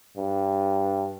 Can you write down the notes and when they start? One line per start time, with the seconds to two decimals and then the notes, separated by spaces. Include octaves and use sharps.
0.17 G2